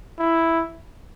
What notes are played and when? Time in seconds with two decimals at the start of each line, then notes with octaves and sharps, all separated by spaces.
0.19 E4